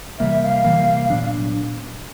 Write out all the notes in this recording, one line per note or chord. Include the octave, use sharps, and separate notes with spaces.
C3 E3 G3 A#3 E5
F5
C3 E3 G3 A#3
A#2 F#3 B3 D4